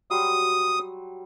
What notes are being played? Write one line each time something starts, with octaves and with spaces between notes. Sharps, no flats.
F#3 G3 C6 D#6